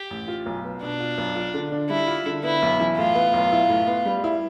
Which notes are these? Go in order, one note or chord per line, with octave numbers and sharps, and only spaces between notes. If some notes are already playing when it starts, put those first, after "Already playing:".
Already playing: G4
A1
F4
B1
B3
B2 D4
F4
B1
F4
D3
D4
G3 E4
F4
D3
B3 E4
B1
E3
A2 F4
B3
B1
E4
A2
B3
G3
E4